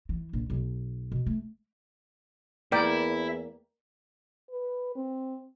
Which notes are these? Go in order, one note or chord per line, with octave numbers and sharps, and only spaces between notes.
E3
A#1
B1
B2
A3
E2 A#3 E4 A#4 D5 G5
B4
C4